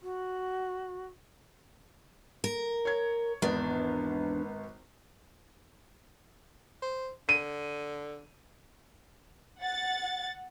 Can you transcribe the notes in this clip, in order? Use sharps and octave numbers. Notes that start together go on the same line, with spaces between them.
F#4
A#4
C#5 G#6
G#1 E2 B3 D4
C5
D3 D#7
F#5 A6